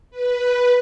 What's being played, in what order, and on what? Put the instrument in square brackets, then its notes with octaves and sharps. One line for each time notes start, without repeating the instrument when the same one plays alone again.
[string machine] B4